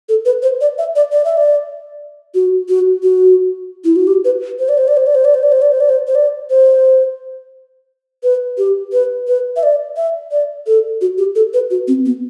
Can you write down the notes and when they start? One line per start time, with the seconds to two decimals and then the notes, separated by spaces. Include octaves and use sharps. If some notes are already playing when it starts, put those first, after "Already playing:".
0.09 A4
0.25 B4
0.43 C5
0.61 D5
0.78 E5
0.96 D5
1.12 D5
1.25 E5
1.37 D5
2.35 F#4
2.69 F#4
3.03 F#4
3.85 E4
3.96 F#4
4.07 G4
4.25 B4
4.59 C5
4.69 D5
4.78 C5
4.88 D5
4.97 C5
5.07 D5
5.15 C5
5.25 D5
5.34 C5
5.43 D5
5.52 C5
5.62 D5
5.72 C5
5.80 D5
5.89 C5
6.07 C5
6.15 D5
6.50 C5
8.23 B4
8.58 G4
8.93 B4
9.28 B4
9.56 E5
9.63 D5
9.97 E5
10.32 D5
10.67 A4
11.01 F#4
11.18 G4
11.35 A4
11.54 B4
11.71 F#4
11.88 C4
12.06 B3